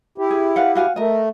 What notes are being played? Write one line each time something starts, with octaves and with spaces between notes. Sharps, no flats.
E4 G4
G#4
B4 F5 F#5
F#4 F5 G#5
A3 A#4 D#5